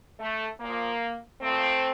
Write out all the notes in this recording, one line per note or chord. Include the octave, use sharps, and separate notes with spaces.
A3
A#2 F3 A#3
A#2 F3 A3 C4